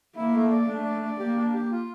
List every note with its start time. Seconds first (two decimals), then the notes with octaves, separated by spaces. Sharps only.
0.16 A#3 E4
0.34 A3
0.51 D5
0.68 A3 D4
0.85 D5
1.02 D5
1.19 A#3 G4
1.37 D4
1.54 G4
1.71 F4